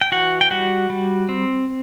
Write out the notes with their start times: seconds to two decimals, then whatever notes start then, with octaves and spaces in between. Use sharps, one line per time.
0.01 G5
0.12 E3 F#4 F#5
0.41 G5
0.50 G3 F#4 F#5
0.90 G3
1.29 C4